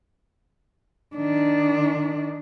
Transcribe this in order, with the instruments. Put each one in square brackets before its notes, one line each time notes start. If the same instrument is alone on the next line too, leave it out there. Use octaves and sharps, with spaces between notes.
[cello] D#3 D4